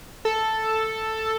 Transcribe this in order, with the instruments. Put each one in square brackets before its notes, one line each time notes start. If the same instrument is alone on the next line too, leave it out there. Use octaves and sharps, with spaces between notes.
[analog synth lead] A4